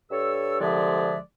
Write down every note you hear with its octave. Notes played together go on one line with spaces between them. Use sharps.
G2 A4 C#5 E6
C2 D3 F3 G#3 D5 E5